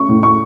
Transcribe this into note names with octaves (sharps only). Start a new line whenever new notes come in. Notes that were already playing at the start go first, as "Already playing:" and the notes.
Already playing: A3 C#4 C#6
A2
C#6